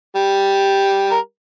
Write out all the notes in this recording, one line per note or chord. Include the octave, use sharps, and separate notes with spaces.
G3 G4
A#4